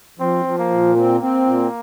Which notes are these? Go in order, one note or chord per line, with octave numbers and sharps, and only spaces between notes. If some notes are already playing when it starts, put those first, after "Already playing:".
F3 C4
F3
A#3
A#2
A#3 C4
C4
A#2